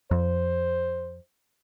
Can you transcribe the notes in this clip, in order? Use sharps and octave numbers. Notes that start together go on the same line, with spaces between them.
F2 C5